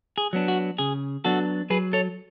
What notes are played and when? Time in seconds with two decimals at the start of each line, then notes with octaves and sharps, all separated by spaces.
0.18 G#4
0.33 F#3 B3 D4
0.48 F#4
0.78 C#3 G#4
1.24 F#3 B3 D4 F#4 A4
1.70 F#3 G#4 B4
1.93 A4 C#5